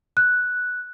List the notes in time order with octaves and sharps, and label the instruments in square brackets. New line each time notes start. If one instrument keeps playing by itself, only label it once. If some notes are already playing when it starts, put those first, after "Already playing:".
[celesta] F#6